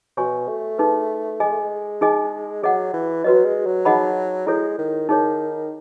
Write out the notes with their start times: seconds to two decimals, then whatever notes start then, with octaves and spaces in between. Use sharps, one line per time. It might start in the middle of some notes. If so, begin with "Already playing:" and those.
0.17 B2 F#4 C#5 G#5 C#6
0.48 A3
0.78 D#4 G#4 B4
1.40 G#3 G#4 D#5 G#5
1.50 A3
1.59 G#3
2.01 D#4 G#4 D#5 G#5
2.63 F#3 G#4 D#5 F#5
2.94 E3
3.24 F#3 F#4 B4 D#5
3.45 G#3
3.66 F#3
3.85 D#4 G#4 D#5 F#5 B5
4.47 G#3 E4 A4 C#5
4.78 D#3
5.09 D#3 D#4 G#4 C#5